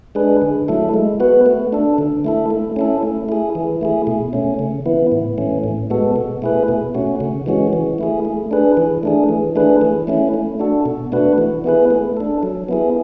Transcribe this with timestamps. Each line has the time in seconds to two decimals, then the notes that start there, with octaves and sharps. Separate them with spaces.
0.15 G#3 D4 G#4 B4
0.42 D3
0.68 F#3 A3 E4 A4
0.94 G#3
1.20 B3 F#4 B4
1.46 A3
1.73 D4 A4
1.98 D3
2.25 A3 E4 A4
2.50 A3
2.76 C#4 E4 A4
3.03 A3
3.29 E4 G#4
3.55 E3
3.81 A3 E4 G#4
4.07 B2
4.33 A3 C#4
4.59 C#3
4.86 E3 B3 E4
5.12 A2
5.38 E3 A3 C#4
5.64 A2
5.90 G#3 B3 F#4 A4
6.16 B2
6.42 A3 E4 G#4 B4
6.68 B2
6.95 A3 C#4 F#4
7.20 C#3
7.46 E3 G#3 C#4 F#4
7.73 E3
7.98 A3 E4 G#4
8.25 A3
8.51 D4 G#4 B4
8.77 E3
9.03 A3 D4 G#4
9.29 E3
9.56 A3 D4 G#4 B4
9.81 E3
10.07 A3 C#4 E4
10.34 A3
10.59 D4 F#4 A4
10.86 B2
11.12 A3 D4 F#4 B4
11.38 E3
11.64 B3 E4 G#4 B4
11.91 A3
12.17 D4 A4
12.43 F#3
12.69 B3 E4 G#4